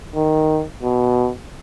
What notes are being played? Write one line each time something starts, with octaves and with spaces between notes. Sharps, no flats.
D#3
B2